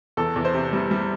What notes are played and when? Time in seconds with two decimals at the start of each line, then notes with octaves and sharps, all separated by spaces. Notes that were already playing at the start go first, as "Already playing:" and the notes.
0.17 E2 A4
0.36 E2
0.45 C5
0.54 C3
0.73 G3
0.91 G3